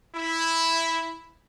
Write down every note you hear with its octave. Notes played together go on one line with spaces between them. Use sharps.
E4